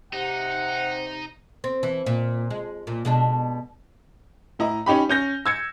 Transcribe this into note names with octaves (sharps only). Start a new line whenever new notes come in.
C3 D#4 F#5
C4
E3
A#2
G#3
A#2
B2 G#3 D4
A2 E4 D#5 A#5
C#4 D#4 G4 B5
C#4 G6 A#6
E6 G#6 C#7